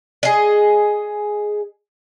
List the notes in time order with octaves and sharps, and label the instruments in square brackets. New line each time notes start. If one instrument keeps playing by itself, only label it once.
[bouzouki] G#4 D#5